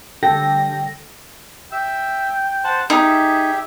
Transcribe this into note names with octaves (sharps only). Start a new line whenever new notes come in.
D3 G3 A4 G5 A#6
E5 G5 E6
C5 F#5 A5
D#4 G4 G#4 E5